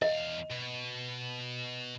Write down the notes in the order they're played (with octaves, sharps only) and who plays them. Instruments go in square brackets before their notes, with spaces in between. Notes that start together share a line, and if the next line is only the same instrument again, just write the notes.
[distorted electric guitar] E2 F5 [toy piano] D#5
[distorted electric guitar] B2